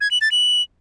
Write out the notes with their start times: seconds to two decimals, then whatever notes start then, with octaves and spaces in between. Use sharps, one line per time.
0.01 G#6
0.11 F#7
0.21 A6
0.32 F#7